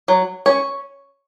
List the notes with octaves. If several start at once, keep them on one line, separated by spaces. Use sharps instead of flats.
F#3
C#4 C#5